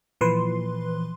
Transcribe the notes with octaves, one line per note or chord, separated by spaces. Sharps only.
A#2 E3 F3 B4 C6